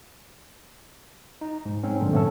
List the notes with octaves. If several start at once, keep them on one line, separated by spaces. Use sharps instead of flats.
D#4
G#2
G#2 C4 C#4
G2 A#2 D3 F3
A3 B3 C#4 A4